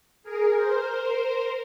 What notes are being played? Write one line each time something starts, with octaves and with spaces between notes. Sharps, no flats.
G#4 A#4
A#4 C5